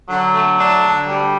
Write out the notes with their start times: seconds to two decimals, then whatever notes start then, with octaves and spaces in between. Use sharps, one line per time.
0.09 D3 F#3
0.34 A3
0.59 D4
0.83 D3
1.08 D2 G3